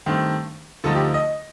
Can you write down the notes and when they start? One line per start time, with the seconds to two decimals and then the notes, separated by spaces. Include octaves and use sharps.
0.06 G2 D#3 A3 C4
0.84 D2 D3 F3 A3 D#4 A4
0.95 G4
1.14 D#5